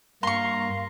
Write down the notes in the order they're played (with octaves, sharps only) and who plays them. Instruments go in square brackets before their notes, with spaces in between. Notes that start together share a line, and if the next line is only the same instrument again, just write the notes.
[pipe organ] G2 A#3 A#5 [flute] F5 [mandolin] C6 C#6